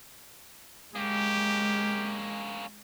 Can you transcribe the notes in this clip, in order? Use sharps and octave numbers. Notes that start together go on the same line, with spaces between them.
G#3 A#3 C#4 G4